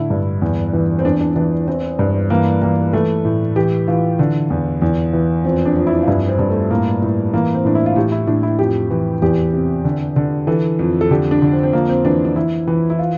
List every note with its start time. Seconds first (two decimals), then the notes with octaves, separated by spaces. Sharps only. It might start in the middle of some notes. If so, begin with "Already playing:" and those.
Already playing: A2 D3 E4
0.10 G2
0.42 E2
0.73 E3
0.99 C4
1.04 E2 D4
1.21 D4
1.36 E3 D4
1.68 E3 C4
1.99 G2
2.30 E3 A#3
2.62 E3 A#3
2.93 E3 A3
3.25 A2
3.56 E3 G4
3.88 E3 F4
4.19 D3
4.50 E2
4.82 E2
5.13 E3
5.45 F2 C4
5.65 D4
5.77 F2
5.87 E4
6.03 F4
6.07 G2 E4
6.28 C4
6.39 G2
6.50 A3
6.70 A2 A#3
7.02 A2
7.33 E3 A#3
7.54 C4
7.65 A2 D4
7.75 E4
7.86 F4
7.96 A2 G4
8.12 E4
8.27 A2 D4
8.43 E4
8.59 F2 G4
8.90 E3
9.22 E2 G4
9.53 C3
9.85 D3
10.16 D3
10.47 E3 A4
10.79 F2
11.01 A4
11.10 D3 G4
11.31 D4
11.42 D3
11.53 C4
11.63 C4
11.73 F2 A#3
11.89 C4
12.05 E3 D4
12.25 D4
12.36 E3 E4
12.67 E3
12.90 E4
12.99 F4